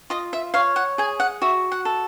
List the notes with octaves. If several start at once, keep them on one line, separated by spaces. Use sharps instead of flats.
F4 D#5
E5
C#5 F5
F#5
G#4 G#5
F#5
F#4 E5
F#5
A4